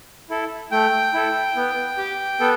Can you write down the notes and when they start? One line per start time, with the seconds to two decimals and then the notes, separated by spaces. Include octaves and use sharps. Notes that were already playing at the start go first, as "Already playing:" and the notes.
0.30 E4 A4
0.72 A3 G5
1.14 E4 A4
1.56 B3
1.98 G4
2.40 B3 A4